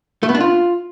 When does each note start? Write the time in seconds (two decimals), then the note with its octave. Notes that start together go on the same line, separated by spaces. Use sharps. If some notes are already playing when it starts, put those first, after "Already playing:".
0.23 A3
0.29 B3
0.35 D4
0.40 F4